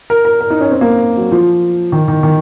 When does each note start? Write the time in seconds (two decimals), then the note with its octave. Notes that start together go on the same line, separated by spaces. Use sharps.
0.10 A#4
0.25 A#4
0.41 A#4
0.50 D#4
0.61 C#4
0.71 C4
0.81 A#3
1.17 F#3
1.32 F3
1.92 D#3
2.08 D#3
2.23 D#3